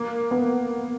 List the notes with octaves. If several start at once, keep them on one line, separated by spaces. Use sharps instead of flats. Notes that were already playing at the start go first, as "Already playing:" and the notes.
Already playing: A#3
B3